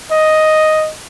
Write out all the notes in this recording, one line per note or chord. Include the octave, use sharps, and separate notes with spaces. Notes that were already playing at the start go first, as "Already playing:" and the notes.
D#5